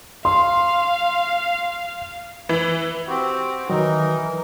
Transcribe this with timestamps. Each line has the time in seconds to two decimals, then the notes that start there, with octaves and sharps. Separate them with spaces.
0.25 F5 C6
2.49 E3
3.07 C4 F#4 G4
3.70 D#3 E3 F#3 D#4 A#4 D#5